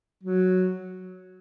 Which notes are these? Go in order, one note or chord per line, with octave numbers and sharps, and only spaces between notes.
F#3